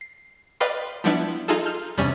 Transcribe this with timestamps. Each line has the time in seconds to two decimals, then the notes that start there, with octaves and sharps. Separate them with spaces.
0.01 C7
0.60 B4 D5 D#5 F5 G5 C6
1.04 F3 G3 B3 D4 E4
1.48 D#4 F4 G#4 A4
1.66 F6 G6
1.98 E2 G2 C3 G3 C#4